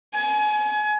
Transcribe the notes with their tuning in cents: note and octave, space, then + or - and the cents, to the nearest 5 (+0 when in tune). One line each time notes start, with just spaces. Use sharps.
G#5 +30